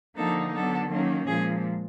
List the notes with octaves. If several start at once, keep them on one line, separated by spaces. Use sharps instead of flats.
D3 F3 A#3 D#4 A4
D3 F#3 B3 A4
D#3 F#3 A#3 C#4
A#2 F3 G#3 G#4